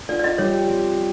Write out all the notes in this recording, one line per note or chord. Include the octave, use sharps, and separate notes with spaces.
F4 D5
D5
D#5
G3 C#5
C4